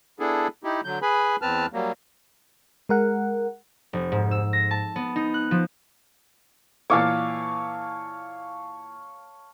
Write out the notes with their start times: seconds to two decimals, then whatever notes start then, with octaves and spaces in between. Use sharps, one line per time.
0.20 B3 D4 E4 G#4 A4
0.64 D#4 E4 G4
0.84 D3 F#3 G6
1.02 G#4 B4 G#5 B5
1.42 E2 C4 B4 A5 F6
1.73 F#3 G3 A#3
2.89 G#3 A#4 F#5
3.93 F1
4.12 G#2
4.31 E6
4.53 A#6
4.71 A5
4.96 B3
5.16 D#4
5.34 F#6
5.51 F3
6.90 A#2 E3 C#5 F5 A5 D6